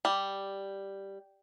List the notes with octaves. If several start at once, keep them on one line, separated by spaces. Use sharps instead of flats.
G3